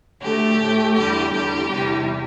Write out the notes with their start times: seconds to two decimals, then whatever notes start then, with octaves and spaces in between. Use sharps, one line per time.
0.21 D2 D3 A3 G4
0.58 A2 A3
0.95 E2 D3 G3 G4
1.32 E2 D3 G3 G4
1.69 E2 C3 E3 G3